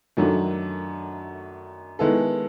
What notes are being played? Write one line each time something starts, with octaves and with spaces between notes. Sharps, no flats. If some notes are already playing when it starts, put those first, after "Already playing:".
F#2 D#3 F#3 A3 D4
D#3 G#3 B3 E4 A4